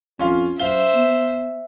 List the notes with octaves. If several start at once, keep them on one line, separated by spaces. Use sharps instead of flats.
F2 C#4 F4 F5
F#2 C5 E5 F5 G7
B3